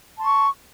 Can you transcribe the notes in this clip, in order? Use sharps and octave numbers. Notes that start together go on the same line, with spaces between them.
A5 C6 C#6